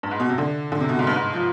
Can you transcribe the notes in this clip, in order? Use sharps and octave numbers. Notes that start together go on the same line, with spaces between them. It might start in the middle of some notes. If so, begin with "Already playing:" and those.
G2
G#2
B2
C3
D3
D3
C3
B2
G#2
G2
G#2
F3